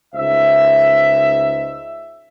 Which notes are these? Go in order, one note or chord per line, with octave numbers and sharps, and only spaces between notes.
C#2 D#4 C5 E5